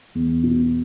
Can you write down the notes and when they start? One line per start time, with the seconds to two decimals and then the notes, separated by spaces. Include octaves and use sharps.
0.15 E2
0.43 B2